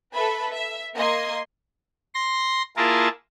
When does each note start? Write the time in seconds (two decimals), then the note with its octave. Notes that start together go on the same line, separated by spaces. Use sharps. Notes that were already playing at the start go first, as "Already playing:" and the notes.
0.13 A4 B4 E5 B5
0.51 E5
0.95 A#3 D#5 C6 G#6
2.14 C6 A#6
2.77 A#3 E4 F4 G#4 A#4 A5